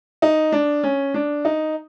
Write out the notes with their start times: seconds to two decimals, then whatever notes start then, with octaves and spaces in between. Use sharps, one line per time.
0.22 D#4
0.52 D4
0.83 C#4
1.14 D4
1.45 D#4